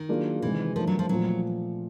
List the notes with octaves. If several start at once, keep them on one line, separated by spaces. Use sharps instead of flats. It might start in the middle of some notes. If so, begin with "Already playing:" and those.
Already playing: D#3
F#3 A#3 D4 F4 G#4
C3 D#3 E3 G#3
E3 F3 A3 D4 F4 A#4
F#3
F3
A#2 F3 F#3 A3 C4